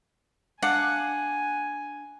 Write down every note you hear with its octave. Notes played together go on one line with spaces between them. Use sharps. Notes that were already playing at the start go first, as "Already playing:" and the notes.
D4 F5 F#5 G#5